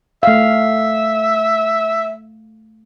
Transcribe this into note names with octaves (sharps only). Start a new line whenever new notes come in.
A3 E5 F5